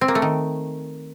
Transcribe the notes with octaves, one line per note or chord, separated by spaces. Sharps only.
C4
A#3
A3
D#3